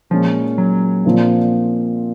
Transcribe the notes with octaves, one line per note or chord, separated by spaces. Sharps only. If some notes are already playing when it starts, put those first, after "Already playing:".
A#2 F3 G#3 C#4
F#3
A#1 A#2 F3 C4 F4